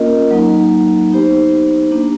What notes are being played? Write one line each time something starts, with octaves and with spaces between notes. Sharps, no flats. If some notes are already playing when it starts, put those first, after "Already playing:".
Already playing: A#3 C#4 F4 A#4 D#5
F#3 A#3 D#4
B3 D#4 G4 C5
A#3 D4 G4